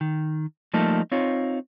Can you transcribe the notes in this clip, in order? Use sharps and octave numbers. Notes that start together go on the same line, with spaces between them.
D#3
F3 G3 A3 A#3 D#4 A4
C4 D#4 F4 C#5